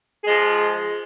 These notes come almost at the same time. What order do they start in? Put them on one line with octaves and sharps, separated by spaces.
G#4 G#3 F3